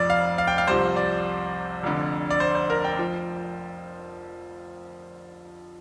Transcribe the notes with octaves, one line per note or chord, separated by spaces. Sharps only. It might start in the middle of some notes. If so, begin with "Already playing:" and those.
Already playing: F1 F2 F3 D5
F5
F5
G5
F5
C2 C3 F3 C5
D5
F1 F2 D3
D5
C5
C5
A#4
G5
F3